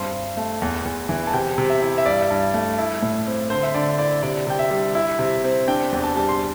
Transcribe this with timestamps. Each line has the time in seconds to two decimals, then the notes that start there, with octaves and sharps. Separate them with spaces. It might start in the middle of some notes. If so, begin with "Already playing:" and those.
Already playing: G2 C4 C6
0.13 G2
0.37 A3
0.62 E2
0.85 E2
1.09 E3
1.27 A5
1.33 C3 G5
1.58 C3
1.70 E5
1.82 E4
1.98 E5
2.06 G2 D5
2.30 G2
2.54 A3
2.78 E4
3.02 A2
3.27 C4
3.50 D3 C5
3.63 E5
3.74 D3 D5
3.99 E4 D5
4.23 C3 D5
4.47 C3 G5
4.59 E5
4.71 G3
4.95 E4
5.19 C3
5.44 C4
5.68 D4 G5
5.92 E2
6.04 A5
6.16 G3 A5
6.29 C6